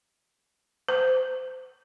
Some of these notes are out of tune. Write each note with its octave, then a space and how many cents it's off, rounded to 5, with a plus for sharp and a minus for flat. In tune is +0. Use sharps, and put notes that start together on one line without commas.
C5 -25